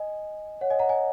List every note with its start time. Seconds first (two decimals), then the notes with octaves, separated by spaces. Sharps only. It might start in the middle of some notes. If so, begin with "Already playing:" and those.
Already playing: D#5 G#5
0.61 C#5 F#5
0.70 D#5 G#5
0.79 F#5 A#5
0.89 D#5 G#5